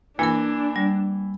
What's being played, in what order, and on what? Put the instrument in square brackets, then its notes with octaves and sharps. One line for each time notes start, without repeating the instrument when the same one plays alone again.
[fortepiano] E3 [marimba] A#3 A#4 [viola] D4
[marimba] G3